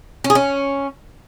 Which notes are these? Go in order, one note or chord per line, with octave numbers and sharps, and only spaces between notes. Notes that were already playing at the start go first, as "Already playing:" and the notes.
C#4
G#4
C#4